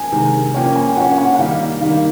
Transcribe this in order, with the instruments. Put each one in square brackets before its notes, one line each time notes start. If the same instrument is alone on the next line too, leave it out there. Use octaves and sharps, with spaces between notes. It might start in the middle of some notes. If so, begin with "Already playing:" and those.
Already playing: [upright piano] G#5
[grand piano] C3 D#3 G#3
[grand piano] F3 A#3 C#4 [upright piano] G5
[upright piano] G#5
G5
[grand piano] F3 A#3 C#4 [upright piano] F#5
[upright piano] F#5
F#5
[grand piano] D#3 G3 A#3 D#4 [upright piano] F5
[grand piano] D#3 G3 A#3 D#4 [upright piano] F5